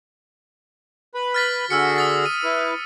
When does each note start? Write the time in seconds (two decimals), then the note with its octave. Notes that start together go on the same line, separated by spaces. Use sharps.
1.15 B4 B5
1.34 F6 A6 B6
1.70 D3 F#4 G#4 E6 F6 C#7
1.96 D#6 A6 B6
2.25 D#7
2.44 E4 B4